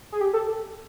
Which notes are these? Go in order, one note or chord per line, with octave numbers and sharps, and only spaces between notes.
G#4
G4
A4